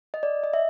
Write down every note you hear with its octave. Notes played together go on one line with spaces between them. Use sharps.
D#5
D5
D#5
E5